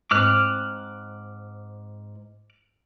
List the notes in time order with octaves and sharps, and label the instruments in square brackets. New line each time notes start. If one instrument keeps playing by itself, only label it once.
[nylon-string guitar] G#2 C4 [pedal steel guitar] D6 F6 F#6